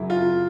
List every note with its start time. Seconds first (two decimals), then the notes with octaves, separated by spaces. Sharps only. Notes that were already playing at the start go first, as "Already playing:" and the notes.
Already playing: F#2 C#3 F#3 E4
0.10 F4